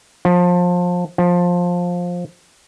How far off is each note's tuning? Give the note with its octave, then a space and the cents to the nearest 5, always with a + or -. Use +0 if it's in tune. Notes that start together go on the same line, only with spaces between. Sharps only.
F3 +25
F3 +15